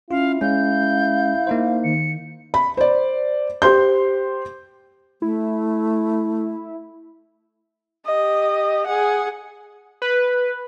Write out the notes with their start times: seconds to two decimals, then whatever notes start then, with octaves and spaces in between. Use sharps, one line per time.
0.11 C#4 E4 F4 F5
0.41 G#3 C#4 F5 G6
1.47 A#3 D#4 C5
1.84 D#3 C#7
2.54 B5
2.77 C5 D5
3.62 G4 C5 C6 G6
5.22 A3 E4
8.06 G4 D#5
8.87 G#4 F#5
10.02 B4